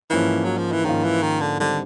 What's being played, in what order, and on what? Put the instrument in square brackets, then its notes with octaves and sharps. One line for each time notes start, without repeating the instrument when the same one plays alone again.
[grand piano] G#2 F3 A#3 C#4 F4 [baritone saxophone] E3
[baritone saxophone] F#3
F3
E3
[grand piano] G#2 F3 A#3 C#4 F4 [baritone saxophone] D#3
[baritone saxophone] E3
D#3
D3
[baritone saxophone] D3 [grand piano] D#3 G3 C4 D#4